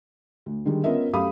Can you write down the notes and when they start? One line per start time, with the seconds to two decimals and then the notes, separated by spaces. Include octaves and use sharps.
0.46 D2
0.65 D3 D#3 G3 G#3
0.84 B3 C#4 F4 A#4 D#5 E5
1.13 F#2 A3 G4 F5 B5 D#6